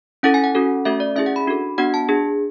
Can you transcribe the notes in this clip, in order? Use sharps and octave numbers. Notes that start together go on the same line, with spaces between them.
C#4 E4 A4 F#5
G#5
F#5
C#4 F#4 A4
A3 C#4 F#4 A4 E5
D5
C#4 E4 G#4 E5
F#5
B5
D4 F#4 A4
B3 D4 F#4 F#5
A5
D4 G#4